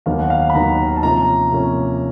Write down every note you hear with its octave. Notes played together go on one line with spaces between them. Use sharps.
D#2 D#3 F#3 B3 F5
F#5
F5
B5
D#2 D#3 F#3 B3 A#5
A5
C3 F3 A#3 C#4 A#5
C3 F3 A#3 C#4